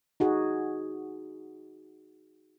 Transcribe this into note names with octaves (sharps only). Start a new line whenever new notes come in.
D#4 F#4 G#4